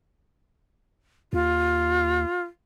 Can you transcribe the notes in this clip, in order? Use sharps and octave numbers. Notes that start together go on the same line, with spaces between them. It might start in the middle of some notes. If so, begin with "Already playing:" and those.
D#2 F4